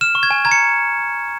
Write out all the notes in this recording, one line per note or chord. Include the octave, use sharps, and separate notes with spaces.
F6 E7
C#6
G#6
G#5
A#5 G#6
C#7